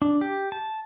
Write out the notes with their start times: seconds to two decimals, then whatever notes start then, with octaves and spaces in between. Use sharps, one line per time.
0.02 D4
0.21 G4
0.52 A5